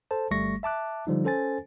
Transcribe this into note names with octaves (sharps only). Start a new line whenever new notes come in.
A4 C5 A5
G1 G3 A3 C#6 A#6
E5 A5 D6 F#6
D3 F3 G3 D#4
C#4 A4 C5 G#5 A6